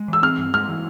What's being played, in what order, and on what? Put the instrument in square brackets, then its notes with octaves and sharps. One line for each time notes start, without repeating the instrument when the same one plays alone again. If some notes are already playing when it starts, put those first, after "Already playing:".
Already playing: [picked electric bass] G#3
[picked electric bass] E3 [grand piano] E6
[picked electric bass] C4 [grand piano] F6
[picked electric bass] G2
[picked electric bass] G#3 [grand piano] F6
[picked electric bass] E3